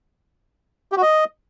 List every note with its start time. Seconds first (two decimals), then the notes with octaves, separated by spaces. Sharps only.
0.92 G4
0.97 F#4
1.02 D#5